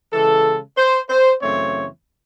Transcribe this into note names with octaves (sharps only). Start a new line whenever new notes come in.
C#3 E3 G#3 A4
C5
C5
F#2 C#3 E3 A3 C4 C#5